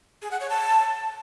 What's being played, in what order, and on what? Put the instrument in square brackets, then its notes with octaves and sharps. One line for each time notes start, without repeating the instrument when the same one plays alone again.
[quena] G#4
F#5
C#5
A5